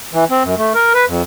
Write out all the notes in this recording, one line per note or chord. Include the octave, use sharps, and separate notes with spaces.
E3
C4
F#2
A3
A#4
B4
F2